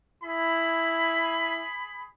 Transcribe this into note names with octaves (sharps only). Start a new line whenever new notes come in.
E4 G#4 B5